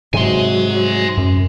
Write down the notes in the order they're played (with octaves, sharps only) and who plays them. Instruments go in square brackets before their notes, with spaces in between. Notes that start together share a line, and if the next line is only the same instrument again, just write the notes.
[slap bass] G#2 C3 [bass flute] F#3 [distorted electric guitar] G#5 C6
[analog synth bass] F#2